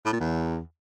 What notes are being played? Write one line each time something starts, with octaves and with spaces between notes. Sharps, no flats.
A2
A#2
E2